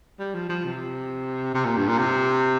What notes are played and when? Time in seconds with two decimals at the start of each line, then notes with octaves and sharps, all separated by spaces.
0.19 G3
0.35 F3
0.49 F3
0.65 C3
1.54 C3
1.65 A#2
1.77 G2
1.88 A#2
1.98 C3